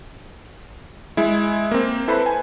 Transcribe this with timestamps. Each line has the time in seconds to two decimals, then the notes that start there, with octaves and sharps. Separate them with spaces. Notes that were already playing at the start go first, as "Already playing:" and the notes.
1.17 G#3 E4
1.71 A#3 C4
2.08 E4 A4 B4 C5 B5
2.26 G#5